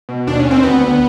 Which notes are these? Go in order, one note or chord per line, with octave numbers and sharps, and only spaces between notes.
B2
D#2 D4
C#4
D#2
C4
D2 B3
D2